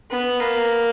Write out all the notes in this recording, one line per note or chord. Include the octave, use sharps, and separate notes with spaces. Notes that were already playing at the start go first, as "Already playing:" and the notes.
B3
A#3